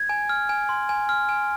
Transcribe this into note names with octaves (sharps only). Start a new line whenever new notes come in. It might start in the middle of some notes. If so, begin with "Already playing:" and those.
Already playing: G#6
G#5
F6
G#5
C6
G#5
F6
G#5